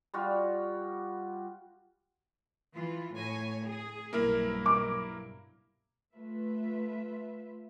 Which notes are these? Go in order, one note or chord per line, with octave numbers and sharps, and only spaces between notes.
G3 F4 F#4
E3 F4
A2 C#5 G#5
G#4
B1 G2 A#3 E4 A#4
D6
A3 F4 B4 E5